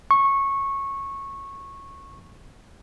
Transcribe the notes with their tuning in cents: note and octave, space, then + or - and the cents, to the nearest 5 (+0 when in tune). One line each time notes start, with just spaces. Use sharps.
C#6 -15